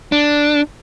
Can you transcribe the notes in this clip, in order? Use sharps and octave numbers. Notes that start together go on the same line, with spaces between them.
D4